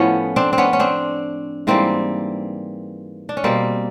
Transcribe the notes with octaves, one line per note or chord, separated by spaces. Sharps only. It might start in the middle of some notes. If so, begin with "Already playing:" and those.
Already playing: A2 F3 B3 C#4
C4 D4
C4
B3 C#4
C#4
C4 D4
G#2 E3 G3 A#3 C4
D4
C#4
B2 G3 A#3 C4